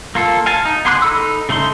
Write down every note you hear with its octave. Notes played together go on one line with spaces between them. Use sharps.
A#3 F4 A4
F5 G#5 A5
D#4
B3 G#4 C6 D6 F#6
D#4 A4 B5 E6
C#3 A3 D#4 C6